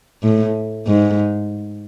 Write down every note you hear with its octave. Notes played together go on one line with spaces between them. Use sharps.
A2
G#2